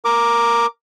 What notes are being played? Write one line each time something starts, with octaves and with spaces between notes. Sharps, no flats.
A#4 D6